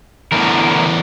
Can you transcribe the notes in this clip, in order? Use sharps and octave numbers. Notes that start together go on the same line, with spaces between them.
E2 A2 D3 E3 A#4